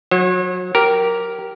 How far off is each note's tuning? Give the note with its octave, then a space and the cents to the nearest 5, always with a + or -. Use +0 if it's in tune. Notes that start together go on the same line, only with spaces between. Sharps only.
F#3 -25 C#5 -45
G4 -15 A#4 +0